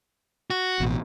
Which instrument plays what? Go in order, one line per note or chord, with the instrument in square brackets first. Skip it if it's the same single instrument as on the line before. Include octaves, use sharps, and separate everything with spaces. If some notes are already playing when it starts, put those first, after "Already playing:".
[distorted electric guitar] F#4
[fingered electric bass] A1 B2